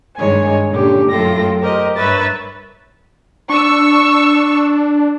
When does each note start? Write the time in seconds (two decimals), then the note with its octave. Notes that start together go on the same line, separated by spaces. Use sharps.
0.16 G2 D#3 G#3 C#5 G#5
0.70 A#2 D3 C#4 G4
1.10 F#2 A3 F4 A4 G5 A#6
1.61 G4 A#4 C5 D#5
1.96 G2 A#4 B4 C#5 E5 A6
3.50 D4 C#6 E6